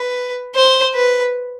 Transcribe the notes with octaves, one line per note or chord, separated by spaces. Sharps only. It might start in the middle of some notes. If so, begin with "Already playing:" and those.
Already playing: B4
C5
B4